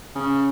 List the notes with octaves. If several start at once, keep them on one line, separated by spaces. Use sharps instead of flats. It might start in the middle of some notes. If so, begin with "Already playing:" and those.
C#3